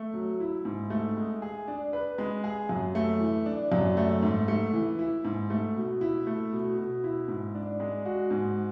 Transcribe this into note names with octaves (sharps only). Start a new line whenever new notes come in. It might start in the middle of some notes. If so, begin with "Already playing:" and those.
Already playing: A3
F#3
E4
G#2
A3
G#3
G#4
D4
B4
G#3
G#4
F#2
A3
E3
D4
F#2
A3
G#2
A3
E3
E4
G#2
A3
B2
E4
A3
B2
B2
E4
G#2
D4
G#3
F#4
G#2